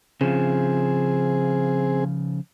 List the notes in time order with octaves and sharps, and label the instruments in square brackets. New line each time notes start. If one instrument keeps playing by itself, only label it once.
[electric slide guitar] C#3 F3 [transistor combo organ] C4 G#4